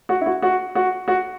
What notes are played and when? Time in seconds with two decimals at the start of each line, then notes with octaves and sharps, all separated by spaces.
0.09 F#4
0.21 E4
0.26 F#4
0.42 F#4
0.75 F#4
1.08 F#4